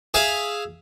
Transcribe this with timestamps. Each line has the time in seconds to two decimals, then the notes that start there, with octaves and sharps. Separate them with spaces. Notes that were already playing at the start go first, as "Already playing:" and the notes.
0.14 G#4 E5 F5